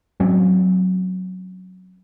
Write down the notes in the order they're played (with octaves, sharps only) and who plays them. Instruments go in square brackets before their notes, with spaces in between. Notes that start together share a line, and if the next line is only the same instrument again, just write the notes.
[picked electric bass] F#3 C4 C#4